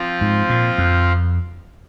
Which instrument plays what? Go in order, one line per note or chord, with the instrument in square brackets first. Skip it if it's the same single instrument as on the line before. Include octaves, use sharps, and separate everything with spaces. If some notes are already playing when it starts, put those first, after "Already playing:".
Already playing: [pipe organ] F3 C4 F4
[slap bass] G#2
A#2
F2